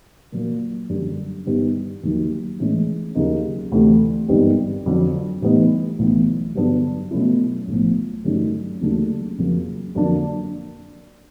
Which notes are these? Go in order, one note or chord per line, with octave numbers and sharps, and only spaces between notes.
A#2 F#3 A#3
F#2 D3 G3
G2 D#3 G3 B3
D#2 D#3 F#3
A2 E3 G#3 C#4
D#2 C#3 F#3 A#3 D#4
D2 C3 E3 A3
G#1 G2 D#3 G3 B3
F2 D3 F#3
A2 E3 G3 B3 D#4
B1 A2 E3
G2 D3 F#3 B3 D4
B2 F#3 A3 C#4 E4
B1 A2 F3
G2 D#3 F#3 A3 C#4
D#2 C#3 F#3 A3 D4
F2 C#3 F#3 A#3
F2 D3 F#3 A#3 D4